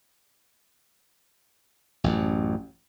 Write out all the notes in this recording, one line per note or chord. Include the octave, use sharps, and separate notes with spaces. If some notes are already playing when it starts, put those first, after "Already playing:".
A1 F#2